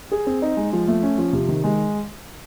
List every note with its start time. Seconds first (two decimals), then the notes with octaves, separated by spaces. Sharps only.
0.12 G#4
0.27 C4
0.42 D#4
0.57 G#3
0.73 F3
0.88 A3
1.03 C#4
1.18 F3
1.33 C3
1.48 D#3
1.64 G#3